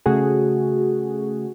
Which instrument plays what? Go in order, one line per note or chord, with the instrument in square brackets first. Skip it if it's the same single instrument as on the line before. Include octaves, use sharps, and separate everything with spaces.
[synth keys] C#3 A3 F#4 G#4